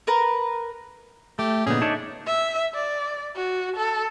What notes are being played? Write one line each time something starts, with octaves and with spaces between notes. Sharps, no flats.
A#4 B4 A#5
A3 G4
A#2 D3 B3 C#4 D#4 G#4
D4 D#4 A4 C#5 D5 E5
E5
D5
F#4
A4